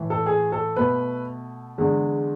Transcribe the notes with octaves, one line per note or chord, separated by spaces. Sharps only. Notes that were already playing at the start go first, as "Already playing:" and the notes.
Already playing: A2 E3 A3
A4
G#4
A4
B2 A3 B4
E2 D3 G#3